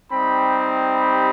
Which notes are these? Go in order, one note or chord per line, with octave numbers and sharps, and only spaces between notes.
G3 C4 D#4 G4 B5
B5